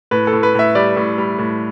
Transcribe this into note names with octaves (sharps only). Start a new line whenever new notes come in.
A2 B4
A4
A2
B4
A2 E5
G3 D5
A2
G3
A2